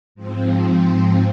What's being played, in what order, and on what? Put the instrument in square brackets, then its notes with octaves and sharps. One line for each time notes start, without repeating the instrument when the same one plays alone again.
[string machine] G#2 F3 C4